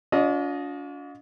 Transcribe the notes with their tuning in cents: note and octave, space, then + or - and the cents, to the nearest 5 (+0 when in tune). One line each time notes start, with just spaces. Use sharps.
D4 -45 F4 +40 D#5 +0